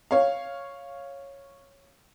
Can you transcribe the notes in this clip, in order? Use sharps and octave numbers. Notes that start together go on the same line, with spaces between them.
C#5 F5